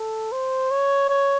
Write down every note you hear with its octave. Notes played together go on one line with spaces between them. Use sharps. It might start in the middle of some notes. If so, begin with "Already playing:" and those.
Already playing: A4
C5
C#5
C#5